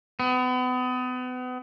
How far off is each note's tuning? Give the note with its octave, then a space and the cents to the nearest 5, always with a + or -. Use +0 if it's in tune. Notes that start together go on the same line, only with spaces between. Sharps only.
B3 +35